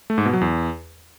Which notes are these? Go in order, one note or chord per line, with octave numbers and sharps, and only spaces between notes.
A3
G#2
B2
F#3
E2